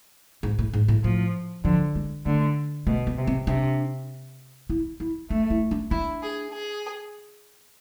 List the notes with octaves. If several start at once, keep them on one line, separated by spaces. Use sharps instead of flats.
G#2
A2
G#2
A2
A2 F3
D3 F3
G#3
D3 A3
B2 A3
B3
C3
C4
C3 D4
E4
E4
A3 D4
E4
D4
D4 E4
G#4
G#4